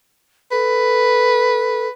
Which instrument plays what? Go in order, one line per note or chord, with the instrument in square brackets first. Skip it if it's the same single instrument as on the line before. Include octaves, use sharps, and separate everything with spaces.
[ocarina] A4 [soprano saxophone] B4